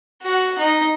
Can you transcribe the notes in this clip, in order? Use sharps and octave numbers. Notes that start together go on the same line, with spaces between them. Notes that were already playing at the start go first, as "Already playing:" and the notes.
F#4 F#5
D#4